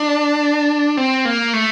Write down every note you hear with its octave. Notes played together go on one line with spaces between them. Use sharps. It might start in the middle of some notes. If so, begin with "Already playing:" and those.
Already playing: D4
C4
A#3
A3